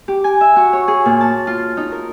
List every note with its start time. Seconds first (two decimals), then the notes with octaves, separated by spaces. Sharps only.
0.08 G4
0.24 G#5
0.41 E5
0.56 F#4
0.73 C#5
0.88 G#4
1.06 A#2
1.21 A5
1.47 F4
1.77 D#4
1.92 A#4